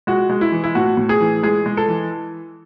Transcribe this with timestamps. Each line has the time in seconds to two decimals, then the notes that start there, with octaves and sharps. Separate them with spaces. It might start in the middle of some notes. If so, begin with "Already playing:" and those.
0.07 G#3 F#4
0.30 G#3
0.41 E4
0.52 E3
0.64 E4
0.75 A2 F#4
0.97 A2
1.09 G#4
1.20 E3
1.43 G#3 G#4
1.66 G#3
1.77 A4
1.88 E3